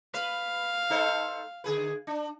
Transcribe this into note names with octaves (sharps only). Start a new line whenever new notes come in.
B4 F5
D#4 A4 C5
D3 G#4 B4
D4